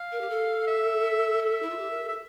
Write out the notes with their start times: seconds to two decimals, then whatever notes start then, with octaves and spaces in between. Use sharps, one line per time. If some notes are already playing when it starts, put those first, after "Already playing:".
Already playing: F5
0.12 A#4
0.21 G4
0.30 A4
0.67 E5
1.42 E5
1.62 E4
1.70 F4
1.78 G4
1.91 A#4
2.03 A4
2.08 E5